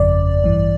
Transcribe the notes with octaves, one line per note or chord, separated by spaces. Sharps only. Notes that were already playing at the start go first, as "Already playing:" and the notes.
Already playing: G1 F2 C#3 D5
A1 G2 E3